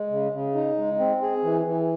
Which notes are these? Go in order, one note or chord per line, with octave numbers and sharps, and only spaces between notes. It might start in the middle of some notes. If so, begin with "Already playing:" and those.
Already playing: G#3
C#3
C#3
D#4
G#3
C4
G#4
E3
E3